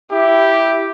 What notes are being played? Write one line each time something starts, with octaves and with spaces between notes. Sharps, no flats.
E4 G4